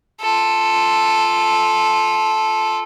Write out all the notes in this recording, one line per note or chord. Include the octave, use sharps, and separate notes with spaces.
F4 A4